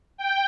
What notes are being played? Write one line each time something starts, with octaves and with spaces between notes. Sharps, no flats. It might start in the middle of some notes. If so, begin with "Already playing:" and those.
G5